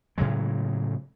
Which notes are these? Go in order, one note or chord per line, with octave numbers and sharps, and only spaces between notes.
A2 C#3 F#3 G#3